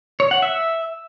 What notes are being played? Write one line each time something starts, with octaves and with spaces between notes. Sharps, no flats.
C#5
F#5
E5